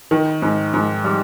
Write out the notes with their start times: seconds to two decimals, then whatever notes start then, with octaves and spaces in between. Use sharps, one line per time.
0.11 D#3
0.42 G#2
0.74 G#2
1.05 G3